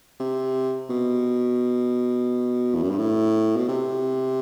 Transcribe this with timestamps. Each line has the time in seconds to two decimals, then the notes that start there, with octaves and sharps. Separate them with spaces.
0.20 C3
0.90 B2
2.75 E2
2.83 F#2
2.91 G2
2.98 A2
3.57 B2
3.68 C3